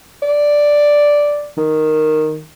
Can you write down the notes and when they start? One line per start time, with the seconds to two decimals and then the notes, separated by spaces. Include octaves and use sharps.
0.23 D5
1.58 D#3